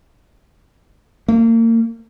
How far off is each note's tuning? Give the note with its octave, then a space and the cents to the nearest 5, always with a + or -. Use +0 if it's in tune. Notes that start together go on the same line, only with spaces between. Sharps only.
A#3 -35